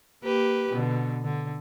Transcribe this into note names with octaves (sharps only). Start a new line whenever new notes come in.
A#3 G4 B4
B2 D3
D3